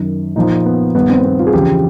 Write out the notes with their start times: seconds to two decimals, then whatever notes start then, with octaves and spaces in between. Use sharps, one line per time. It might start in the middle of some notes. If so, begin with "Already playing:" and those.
Already playing: F#2 D#3
0.36 A#2 F3 D#4
0.66 B3
0.95 G2 D#3 B3
1.09 C4
1.25 B3
1.39 F4
1.47 G#4
1.53 E2 C#3 F3 G4